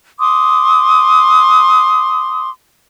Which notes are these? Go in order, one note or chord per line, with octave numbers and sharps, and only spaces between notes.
C6 D6 D#6